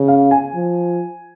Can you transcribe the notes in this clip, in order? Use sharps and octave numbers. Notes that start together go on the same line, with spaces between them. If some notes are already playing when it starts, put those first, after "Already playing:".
Already playing: C#3
F5
G#5
F3